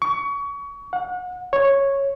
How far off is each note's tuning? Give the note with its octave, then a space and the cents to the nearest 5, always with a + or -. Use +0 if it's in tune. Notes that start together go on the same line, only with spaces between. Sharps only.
C#6 +30
F#5 -35
C#5 -5